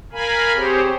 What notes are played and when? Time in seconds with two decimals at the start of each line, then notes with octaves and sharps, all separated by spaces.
0.12 A#4 F5 G#5 B5
0.55 C4 G4 G#4 C5 C#5